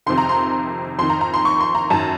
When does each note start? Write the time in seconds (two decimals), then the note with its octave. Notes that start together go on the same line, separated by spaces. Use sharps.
0.06 F2 C3 D#3 C6
0.18 A#5
0.29 C6
0.99 F2 D#3 C6
1.10 A#5
1.21 A#5
1.34 C6
1.45 C#6
1.60 C6
1.75 A#5
1.90 F#2 D#3 A5